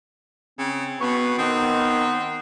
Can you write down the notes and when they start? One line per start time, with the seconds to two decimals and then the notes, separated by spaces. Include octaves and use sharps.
0.58 C#3 C4
1.01 B2 B3 C#6
1.38 D#3 B3 C4